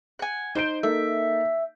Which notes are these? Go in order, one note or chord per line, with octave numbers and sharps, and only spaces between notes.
F#5 G#5
D#4 C5 G6 D7
A#3 D#4 A4 E5